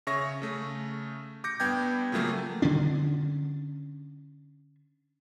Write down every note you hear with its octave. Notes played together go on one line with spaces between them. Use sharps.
C#3 C#5 E5 C#6 A#6
C#3 A3
D6 G6 A#6 C#7
G2 B3 G5 G6 G#6
C#3 F3 F#3 A3 A#3
D3 C#4 D4